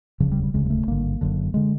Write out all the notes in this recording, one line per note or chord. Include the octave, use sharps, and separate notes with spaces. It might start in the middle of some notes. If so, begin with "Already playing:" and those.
E1 D2 C#3 F3
G3
G3
E1 D2 C#3 G#3
G#3
A3
G#1 G2 D3 A#3
F#1 F#2 D3
D3 G#3